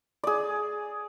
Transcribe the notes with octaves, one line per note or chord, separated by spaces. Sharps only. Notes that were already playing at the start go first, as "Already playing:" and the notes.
G#4 D5